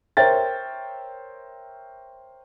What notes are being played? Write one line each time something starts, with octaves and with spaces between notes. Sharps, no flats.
A#4 C5 C#5 E5 G5 A6